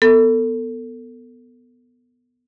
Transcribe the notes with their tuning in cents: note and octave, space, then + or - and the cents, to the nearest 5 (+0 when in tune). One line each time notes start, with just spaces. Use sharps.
B3 +0 A4 +25